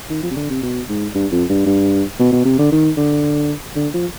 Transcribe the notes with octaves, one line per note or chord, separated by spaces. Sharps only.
D#3
F3
C3
D3
C3
B2
G#2
G2
F2
G2
G2
B2
B2
C3
D3
D#3
D3
D3
F3